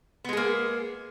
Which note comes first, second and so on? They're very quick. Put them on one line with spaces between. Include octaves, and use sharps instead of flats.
B3 G#3 G#4 A#3